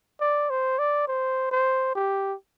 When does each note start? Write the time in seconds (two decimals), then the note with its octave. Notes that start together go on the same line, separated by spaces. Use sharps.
0.20 D5
0.50 C5
0.79 D5
1.08 C5
1.51 C5
1.95 G4